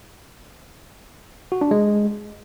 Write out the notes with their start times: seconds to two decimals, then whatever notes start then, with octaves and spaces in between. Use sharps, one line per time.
1.52 F#4
1.61 D4
1.71 G#3